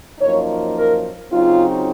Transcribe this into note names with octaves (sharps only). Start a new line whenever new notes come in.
F#2 F3 A#3 D#4 C#5
A#4
C#3 F#3 C4 D#4 F4